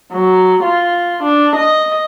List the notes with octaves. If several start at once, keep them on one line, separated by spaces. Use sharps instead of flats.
F#3
F4
D4
D#5